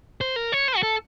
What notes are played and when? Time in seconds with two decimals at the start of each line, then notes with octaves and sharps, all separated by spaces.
0.21 C5
0.36 A#4
0.52 C#5
0.68 C5
0.77 F#4
0.83 A4